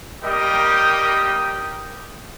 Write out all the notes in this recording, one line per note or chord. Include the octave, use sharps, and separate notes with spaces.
G3 A#3 G4 A#4 D#5 G5